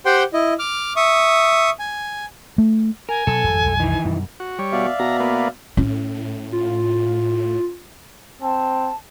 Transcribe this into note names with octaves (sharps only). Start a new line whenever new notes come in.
G4 C5 F#5 G5 C6
E4 D#5
D6 F6
E5 C#6 D#6
G#5
A3
A#4 G#5
B2 F#3 B3 A4
G#1 F2 G3
B1 F2 G#3
D#3 E3
F#2 B2 G3
F#4
G3 C#5
B2 D5 E5 F5
B2 A#5
A#3 B3
A2 C#4
F4
C4 A5